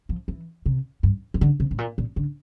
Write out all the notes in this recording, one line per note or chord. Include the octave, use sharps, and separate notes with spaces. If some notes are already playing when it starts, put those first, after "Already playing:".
F3
E3
C3
G2
E3
D3
C3
A2
A#2
A#2
D3